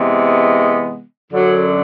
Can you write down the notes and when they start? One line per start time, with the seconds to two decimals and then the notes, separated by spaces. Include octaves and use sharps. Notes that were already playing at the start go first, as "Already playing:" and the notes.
Already playing: C3 E3 G#3 B3
1.33 F#2 D3 F#3